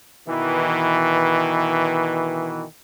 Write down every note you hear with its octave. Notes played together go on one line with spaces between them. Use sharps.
B2 D#3 E3